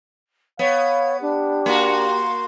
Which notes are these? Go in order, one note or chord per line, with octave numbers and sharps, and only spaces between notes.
B3 C#5 F5
D4 G4
A#3 F#4 C6